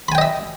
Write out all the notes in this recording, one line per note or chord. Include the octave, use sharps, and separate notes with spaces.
D#5 E5 G5 G#5 B5